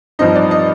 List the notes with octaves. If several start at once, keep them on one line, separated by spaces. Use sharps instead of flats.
G2 F3 C4 D#4 D#5
D5
D#5